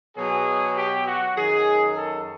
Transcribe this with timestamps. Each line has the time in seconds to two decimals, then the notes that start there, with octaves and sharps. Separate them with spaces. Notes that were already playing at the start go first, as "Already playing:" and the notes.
0.16 B2 F#3 G#4
0.76 G4
1.06 F#4
1.35 F#2 D#3 F#3 G#4
1.96 A4